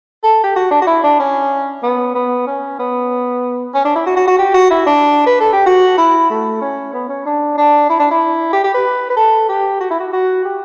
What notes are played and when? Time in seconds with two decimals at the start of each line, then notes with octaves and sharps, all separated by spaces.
0.23 A4
0.43 G4
0.56 F#4
0.71 D4
0.82 F#4
0.87 E4
1.03 D4
1.19 C#4
1.83 B3
2.14 B3
2.47 C#4
2.79 B3
3.74 C#4
3.85 D4
3.95 E4
4.06 F#4
4.16 F#4
4.27 F#4
4.38 G4
4.54 F#4
4.70 E4
4.86 D4
5.26 B4
5.40 A4
5.53 G4
5.66 F#4
5.97 E4
6.30 A3
6.61 C#4
6.93 B3
7.09 C#4
7.25 D4
7.57 D4
7.89 E4
7.99 D4
8.11 E4
8.52 G4
8.64 G4
8.74 B4
9.10 B4
9.16 A4
9.49 G4
9.80 F#4
9.90 E4
10.00 F#4
10.13 F#4
10.44 G4